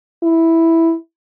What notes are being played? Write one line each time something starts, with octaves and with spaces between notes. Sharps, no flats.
E4